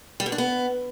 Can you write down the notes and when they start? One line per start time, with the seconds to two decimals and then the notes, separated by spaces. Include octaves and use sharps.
0.20 G3
0.26 B2
0.32 D4
0.38 B3